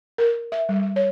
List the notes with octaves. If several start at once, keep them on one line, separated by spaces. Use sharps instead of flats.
A#4
E5
G3
C#5